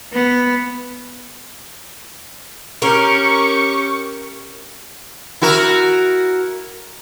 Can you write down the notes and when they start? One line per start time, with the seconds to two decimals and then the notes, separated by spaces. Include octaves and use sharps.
0.13 B3
2.82 C#4 G4 A#4 C#6
5.42 E4 F#4 A#4